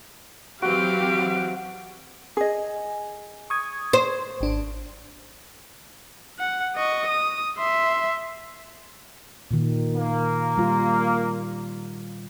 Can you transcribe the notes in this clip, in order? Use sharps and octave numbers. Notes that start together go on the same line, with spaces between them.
E3 F#3 C4 F#4 G4 F5 D7
G#4 D#5 G#5
C#6 D#6 G#6
C5
G#1 D4
F#5
D#5 C#6
D#6
E5 C6
A#2 D#3
A#3
G3 F4